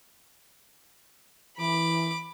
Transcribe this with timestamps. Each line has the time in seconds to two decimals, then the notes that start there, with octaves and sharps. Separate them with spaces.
1.58 E3 B5 D6